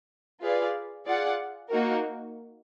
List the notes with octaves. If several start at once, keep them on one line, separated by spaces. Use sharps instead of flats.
F4 G#4 B4 D5 F5
F4 G#4 D5 F#5
A#3 D#4 F#4 A#4